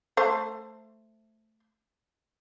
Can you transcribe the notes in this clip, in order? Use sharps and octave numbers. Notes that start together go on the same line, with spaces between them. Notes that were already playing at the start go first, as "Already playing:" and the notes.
A3 C5